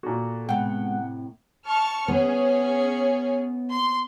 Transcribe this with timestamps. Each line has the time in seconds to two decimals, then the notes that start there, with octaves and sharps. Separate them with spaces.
0.03 A#2 F#4 A4
0.49 A2 C3 G#3 B3 F#5 G5
1.65 A5 C#6 F6
2.08 B3 C#4 G#4
3.70 C6